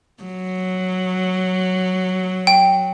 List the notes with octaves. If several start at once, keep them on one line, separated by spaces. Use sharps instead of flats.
F#3
G5